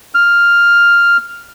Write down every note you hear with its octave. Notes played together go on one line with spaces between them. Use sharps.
F6